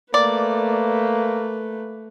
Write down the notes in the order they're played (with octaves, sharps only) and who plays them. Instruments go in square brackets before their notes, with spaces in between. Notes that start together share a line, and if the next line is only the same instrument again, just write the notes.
[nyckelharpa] A3 B4 [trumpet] A#3 [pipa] D5